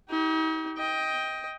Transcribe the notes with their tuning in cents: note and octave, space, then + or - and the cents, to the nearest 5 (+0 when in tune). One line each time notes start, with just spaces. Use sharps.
D#4 +40 G4 -20
D#5 +20 G5 +5